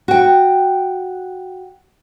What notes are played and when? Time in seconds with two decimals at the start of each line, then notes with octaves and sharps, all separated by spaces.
0.08 F#4 G5